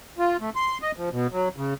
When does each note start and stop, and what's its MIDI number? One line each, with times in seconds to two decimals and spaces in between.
0.18 0.37 65
0.41 0.50 57
0.56 0.78 84
0.82 0.92 75
0.97 1.09 53
1.12 1.27 47
1.32 1.49 54
1.56 1.74 49